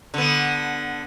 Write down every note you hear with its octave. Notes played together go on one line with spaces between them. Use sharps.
D3 B3